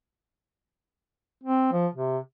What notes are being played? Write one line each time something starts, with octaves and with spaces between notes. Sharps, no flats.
C4
F3
C3